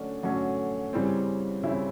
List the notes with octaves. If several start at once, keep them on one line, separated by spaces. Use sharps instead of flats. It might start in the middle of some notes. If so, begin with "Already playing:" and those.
Already playing: D3 F#3 A3 C#4 D4
D3 F#3 A3 C#4
C#3 E3 G3 C4
C#3 E3 G3 C4 E4